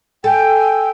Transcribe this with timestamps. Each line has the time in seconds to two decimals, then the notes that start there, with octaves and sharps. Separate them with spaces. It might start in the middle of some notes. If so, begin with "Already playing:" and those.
0.24 A4 G5 G#5 E6